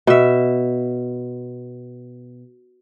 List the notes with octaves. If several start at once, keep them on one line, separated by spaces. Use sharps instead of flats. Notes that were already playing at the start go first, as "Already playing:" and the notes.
B2 E5